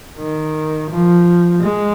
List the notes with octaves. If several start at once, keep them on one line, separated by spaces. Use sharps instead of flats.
D#3
F3
G#3